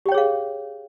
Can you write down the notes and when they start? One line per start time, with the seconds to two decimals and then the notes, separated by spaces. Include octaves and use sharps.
0.06 G4
0.09 G5
0.12 C#5
0.15 G#4
0.18 F5